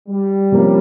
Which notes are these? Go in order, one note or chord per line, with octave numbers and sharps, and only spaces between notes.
G3
C3 F3 A#3 C#4